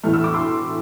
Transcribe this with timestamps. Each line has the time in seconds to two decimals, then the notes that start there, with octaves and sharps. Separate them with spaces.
0.03 A2 E3 A3 F6
0.14 E6
0.24 D6
0.34 C6 E6